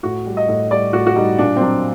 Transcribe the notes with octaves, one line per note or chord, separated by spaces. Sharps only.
A2 F#4
G3
D#5
A2
G3 D5
A2 F#4
F#4
G3 D#4
A#2 D4
C4
F#3 D4